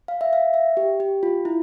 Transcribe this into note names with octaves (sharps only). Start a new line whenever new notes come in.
F5
E5
F5
E5
G4
G4
F4
E4